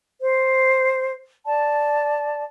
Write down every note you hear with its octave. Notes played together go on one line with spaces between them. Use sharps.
C5
D5 A5